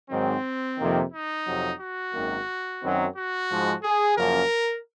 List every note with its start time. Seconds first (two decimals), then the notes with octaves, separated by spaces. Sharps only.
0.10 G#2 D#3 F#3 C4
0.78 F2 C3 D#3 A#3
1.12 D#4
1.46 F2 C3 F#3
1.80 F#4
2.14 G#1 F#2 D#3 A#3
2.82 F#2 D#3 F#3 C4
3.15 F#4
3.50 G#2 F3 G#3
3.83 G#4
4.17 F#2 C#3 F3 A#3 A#4